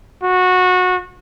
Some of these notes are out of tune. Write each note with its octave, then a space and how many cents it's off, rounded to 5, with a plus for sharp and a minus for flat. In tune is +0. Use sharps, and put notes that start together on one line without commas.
F#4 -20